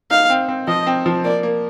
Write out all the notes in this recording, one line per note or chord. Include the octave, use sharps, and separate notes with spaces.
D#4 F5
C4
C4
F3 D#5
C4
F3
A#3 D5
A#3